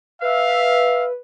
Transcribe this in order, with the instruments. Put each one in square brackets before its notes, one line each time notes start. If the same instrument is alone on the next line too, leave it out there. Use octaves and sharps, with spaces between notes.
[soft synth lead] B4 [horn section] E5 F5